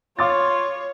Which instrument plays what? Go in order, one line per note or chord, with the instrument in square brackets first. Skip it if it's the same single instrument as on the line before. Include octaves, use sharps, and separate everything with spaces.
[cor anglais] F4 [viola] C#5 [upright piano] F5 D6 A6